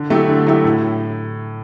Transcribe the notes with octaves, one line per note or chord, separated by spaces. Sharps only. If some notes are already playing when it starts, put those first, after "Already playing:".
Already playing: D3
F#3 A3 E4 G4
D3
F#3 A3 E4 G4
A2